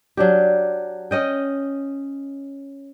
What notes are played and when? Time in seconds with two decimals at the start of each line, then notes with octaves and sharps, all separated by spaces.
0.17 F#3 D4 G4
1.11 C#4 D#5 G5